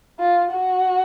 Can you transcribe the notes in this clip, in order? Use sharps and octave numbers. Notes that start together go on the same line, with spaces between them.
F4
F#4